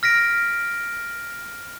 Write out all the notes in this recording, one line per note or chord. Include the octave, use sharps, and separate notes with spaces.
F6 A#6 B6 D7